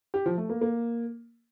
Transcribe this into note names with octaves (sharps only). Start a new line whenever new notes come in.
G4
F3
A3
A#3
A#3